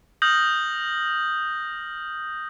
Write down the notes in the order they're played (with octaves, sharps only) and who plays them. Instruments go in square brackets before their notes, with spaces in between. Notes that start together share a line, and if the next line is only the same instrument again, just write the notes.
[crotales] D#6 F6 G6 A#6 F#7